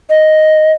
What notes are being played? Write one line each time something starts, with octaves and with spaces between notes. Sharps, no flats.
D#5